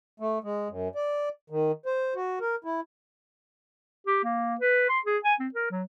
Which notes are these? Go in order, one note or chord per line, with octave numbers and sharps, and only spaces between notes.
A3
G#3
F#2
D5
D#3
C5
F#4
A#4
E4
G4
A#3
B4
C6
G#4
G#5
C4
A#4
F#3